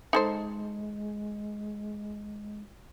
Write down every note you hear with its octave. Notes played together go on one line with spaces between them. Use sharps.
G#3 D#4 A4 C5